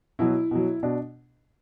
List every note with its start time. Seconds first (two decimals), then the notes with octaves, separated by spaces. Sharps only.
0.19 B2 F#3 E4
0.51 B2 F#3
0.83 B2 D4